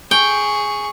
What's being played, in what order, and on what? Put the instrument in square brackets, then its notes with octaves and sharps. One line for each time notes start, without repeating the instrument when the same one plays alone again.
[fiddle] G#4 C#6 [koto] G5